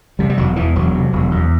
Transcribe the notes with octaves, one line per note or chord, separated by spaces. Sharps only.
C3 G3
G3
E1 F#3
E2 E3
E1 F#3
C3
E1
E2